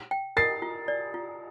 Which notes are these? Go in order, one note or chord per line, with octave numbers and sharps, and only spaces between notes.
G5
A#4 A6 C7
F4
D5
F4